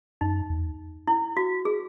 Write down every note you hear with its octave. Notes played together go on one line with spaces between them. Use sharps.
F#2 D#4
E2
E4
F#4
G#4